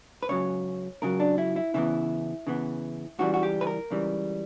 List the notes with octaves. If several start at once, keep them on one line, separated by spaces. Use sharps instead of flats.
B4
C#2 C#3 F#3 C#5
C#2 C#3 F#3 A#4
D4
E4
E4
C#3 E3 B3 E4
C#3 E3 B3
C#2 C#3 E3 G3 F#4
F#4
G4
B4
A#4
C#2 C#3 E3 G3